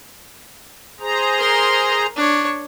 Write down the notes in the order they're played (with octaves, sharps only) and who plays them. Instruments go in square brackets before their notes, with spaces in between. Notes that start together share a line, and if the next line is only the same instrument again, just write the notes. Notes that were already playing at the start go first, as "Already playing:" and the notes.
[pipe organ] G#4 C5 A#5
[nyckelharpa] A#4 C6
D4 C#5